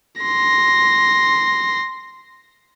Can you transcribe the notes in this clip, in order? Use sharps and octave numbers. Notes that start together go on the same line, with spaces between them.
C6 A#6